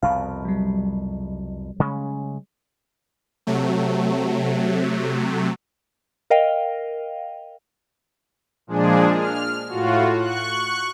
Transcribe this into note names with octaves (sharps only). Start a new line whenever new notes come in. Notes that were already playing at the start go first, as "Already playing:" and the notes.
C2 F2 B2 F5
F#3 G3
C#3 G#3 C#4
C3 F#3 A3
A#4 D#5 F5 G5
A#2 F3 G#3 D4 G#4
F6
A2 F4 F#4
C#6 F#6